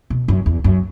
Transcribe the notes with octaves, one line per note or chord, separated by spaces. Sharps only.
B2
F#2
E2
F#2